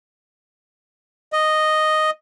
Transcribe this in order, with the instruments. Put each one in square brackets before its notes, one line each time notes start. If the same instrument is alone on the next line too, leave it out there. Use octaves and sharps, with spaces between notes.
[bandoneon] D#5